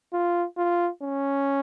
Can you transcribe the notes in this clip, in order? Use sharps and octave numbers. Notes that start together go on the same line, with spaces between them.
F4
F4
C#4